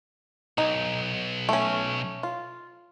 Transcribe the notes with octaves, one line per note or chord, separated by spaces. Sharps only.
B1 D#4
A3 C#4
F4